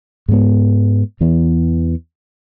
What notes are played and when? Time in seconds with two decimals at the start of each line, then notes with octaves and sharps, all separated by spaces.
0.28 G#2 G#3 B3
1.20 E2 E3 B3